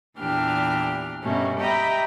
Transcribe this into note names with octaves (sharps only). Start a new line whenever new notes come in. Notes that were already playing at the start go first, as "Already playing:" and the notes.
E2 A#2 E3 D4 G4 F6
G2 B2 G3 A3 A#3 C#4
G4 D#5 E5 G5 A#5 B5